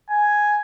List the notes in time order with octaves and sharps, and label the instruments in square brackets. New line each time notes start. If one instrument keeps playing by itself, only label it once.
[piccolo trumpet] G#5